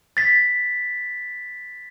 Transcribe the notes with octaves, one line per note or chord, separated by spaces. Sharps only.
A6 B6